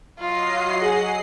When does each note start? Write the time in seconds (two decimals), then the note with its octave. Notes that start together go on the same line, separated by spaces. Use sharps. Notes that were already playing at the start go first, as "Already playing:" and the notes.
0.19 F#3 F4 D#5 C7
0.82 G#4 F#5